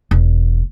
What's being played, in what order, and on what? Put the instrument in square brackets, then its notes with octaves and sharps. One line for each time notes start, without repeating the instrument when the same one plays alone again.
[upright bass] E1